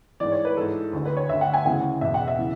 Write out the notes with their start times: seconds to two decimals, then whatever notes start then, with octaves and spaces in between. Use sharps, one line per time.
0.20 G#2 E3 D5
0.32 C#5
0.45 B4
0.57 G#2 E3 A4
0.93 D2 D3
1.05 B4
1.17 C#5
1.29 D2 D3 E5
1.41 F#5
1.54 G#5
1.65 D2 C#3 E3 F#5
2.01 E2 B2 E5
2.14 F#5
2.28 E5
2.38 C#3 E3